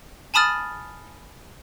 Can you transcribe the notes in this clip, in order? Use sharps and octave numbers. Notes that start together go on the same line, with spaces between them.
G#5 A5 B5 D#6 F6 A6